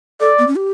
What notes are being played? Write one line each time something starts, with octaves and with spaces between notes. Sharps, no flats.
A4 D5
B3
C#4
G4